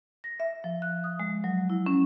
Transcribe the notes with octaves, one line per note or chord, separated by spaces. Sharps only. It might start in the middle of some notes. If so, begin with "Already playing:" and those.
A#6
E5
F3
F#6
D#6
G#3
F#3
E4
C#4